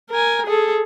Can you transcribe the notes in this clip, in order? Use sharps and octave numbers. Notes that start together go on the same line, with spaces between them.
A#4 G#5
G#4 A4